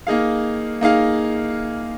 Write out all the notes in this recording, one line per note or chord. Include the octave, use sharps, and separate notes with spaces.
A#3 D#4 G#4 F5
A#3 D#4 G#4 F5